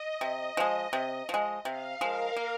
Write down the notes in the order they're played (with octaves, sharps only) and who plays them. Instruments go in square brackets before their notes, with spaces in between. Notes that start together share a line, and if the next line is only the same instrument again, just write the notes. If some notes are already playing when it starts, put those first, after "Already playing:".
Already playing: [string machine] D#5
[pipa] C3
F3 G#3
C3
F3 G#3
[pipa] C3 [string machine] F5
[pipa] F3 G#3 [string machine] A#4
[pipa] A#3